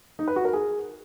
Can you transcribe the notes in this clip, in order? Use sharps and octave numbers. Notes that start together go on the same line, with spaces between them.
D#4
B4
F#4
A#4
G#4